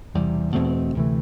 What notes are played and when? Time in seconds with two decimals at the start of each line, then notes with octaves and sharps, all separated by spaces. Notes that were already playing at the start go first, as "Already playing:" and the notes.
0.14 E1 E2 C3 G3
0.54 E2 B2 A3 C4
0.95 D2 C3 E3 A3